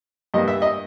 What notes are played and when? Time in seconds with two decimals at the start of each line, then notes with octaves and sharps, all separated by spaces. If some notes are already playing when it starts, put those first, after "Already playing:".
0.34 G2 G3 A#3 D#5
0.48 E5
0.62 D#5